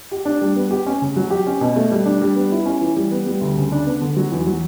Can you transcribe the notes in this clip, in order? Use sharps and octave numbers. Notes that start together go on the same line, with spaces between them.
G4
D4
G3
B3
G4
C#4
C#3
F#3
G4
C#4
B2
A3
G3
D4
G3
B3
E4
C#4
E3
G3
B3
G3
D2
C#3
D4
B3
D3
F#3
E2
F#3